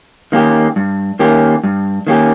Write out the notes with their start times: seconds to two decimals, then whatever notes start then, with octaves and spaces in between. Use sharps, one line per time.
0.32 D#3 A#3 C#4 G4
0.76 G2
1.19 D#3 A#3 C#4 G4
1.64 G2
2.07 D#3 A#3 C#4 G4